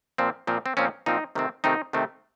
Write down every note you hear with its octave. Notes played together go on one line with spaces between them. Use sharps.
A#2 F3 C4
A#2 F3 C4
C4
A#2 F3 C4 C#4
A#2 F3 C4 D#4
C3 D#3 A3 C4
C3 D#3 A3 C4 D#4
C3 D#3 A3 C4